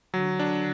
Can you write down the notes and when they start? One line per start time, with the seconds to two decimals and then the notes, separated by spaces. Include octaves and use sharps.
0.13 D3 F#3
0.39 D4